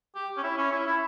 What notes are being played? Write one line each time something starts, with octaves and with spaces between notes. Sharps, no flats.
G4
C#4
E4
C#4
E4
E4